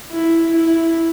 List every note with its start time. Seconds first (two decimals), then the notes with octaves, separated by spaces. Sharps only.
0.12 E4
0.56 E4